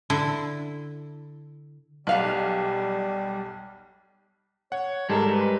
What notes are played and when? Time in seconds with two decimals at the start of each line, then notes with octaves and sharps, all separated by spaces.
0.10 D3 E4
2.07 B1 G3 B4 F5 F#5
4.72 C#5 F#5
5.10 G#2 G3 G#3 A4 A#4
5.32 B4